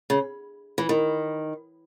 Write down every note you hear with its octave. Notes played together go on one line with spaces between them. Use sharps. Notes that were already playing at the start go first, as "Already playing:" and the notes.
C#3
E3
D#3